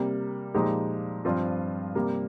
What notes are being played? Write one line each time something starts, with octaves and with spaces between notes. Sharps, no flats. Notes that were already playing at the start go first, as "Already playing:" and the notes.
Already playing: C3 G3 A#3
A#2 F3 G#3 D#4 G4
G2 F3 C4 F4
C3 G3 A#3